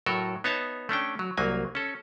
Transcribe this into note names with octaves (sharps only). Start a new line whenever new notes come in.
A2 F#3 A4 A#4
B3 D#4 C#5 E5 A5
A3 C#4 D4 G5
F#3
C2 F#3 A#3 G#5
C#4 A4